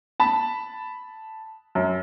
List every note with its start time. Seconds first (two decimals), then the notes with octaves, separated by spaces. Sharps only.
0.20 A5 B5
1.75 F#2